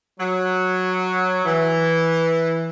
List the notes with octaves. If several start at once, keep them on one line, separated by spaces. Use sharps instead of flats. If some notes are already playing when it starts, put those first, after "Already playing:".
F#3
E3